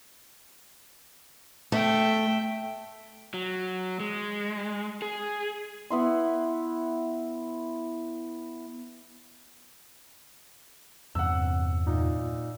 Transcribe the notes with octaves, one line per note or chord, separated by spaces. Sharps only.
A3 E5 G5
F#3
G#3
G#4
B3 E4 C6
E2 G2 C3 F#5 E6
A#2 D#4